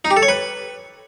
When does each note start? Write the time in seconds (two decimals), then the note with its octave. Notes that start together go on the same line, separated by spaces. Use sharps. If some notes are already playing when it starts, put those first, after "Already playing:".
0.05 D#4
0.11 G4
0.17 A4
0.23 C#5
0.28 B4